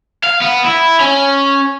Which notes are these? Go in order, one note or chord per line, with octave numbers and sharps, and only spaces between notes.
F5
B3
E4
C#4